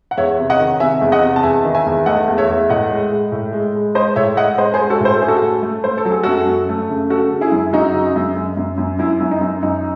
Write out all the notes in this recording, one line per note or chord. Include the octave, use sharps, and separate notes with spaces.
F#5
E2 C#5 E5
C3
D#5 F#5
D#3
C3 E5 G#5
E2
D#5 F#5
C3
A5
E2 E5 G#5
D#3
E5 G#5
E2
A3 D#5 F#5
E2
C#5 E5
E2
A2 D#5 F#5
G#3
G#3
A2
G#3
G#3
G#3 C5 D#5
A2 C#5 E5
G#3 D#5 F#5
G#3 C5 D#5
G#4 C5
G#3
F#4 A4
A2 C5
A4
A3 G#4
F#4 A4
A3
A3
A3 C5
A4
F#3
G#4
F#2 F#4 A4
F#2
A3
C#3
C#3 F#4 A4
C#3
E4 G#4
F#2
F#2 D#4 F#4
C#3
F#2
F#2
F#2
F#2
F#2 E4
F#2
D#4
F#2
F#2 D#4